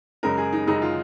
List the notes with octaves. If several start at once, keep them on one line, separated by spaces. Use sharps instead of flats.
F#2 C#3 G#3 A#4
G#4
D#4
F#2 C#3 G#3 D#4
F4